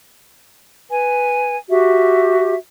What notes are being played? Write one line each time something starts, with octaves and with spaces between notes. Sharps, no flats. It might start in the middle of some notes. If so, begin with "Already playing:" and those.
B4 G#5
F#4 G4 E5